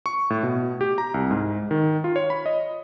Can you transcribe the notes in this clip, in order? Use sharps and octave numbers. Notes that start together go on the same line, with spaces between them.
C#6
A2
B2
G4
A#5
C2
G#2
D#3
F4
C#5
B5
D#5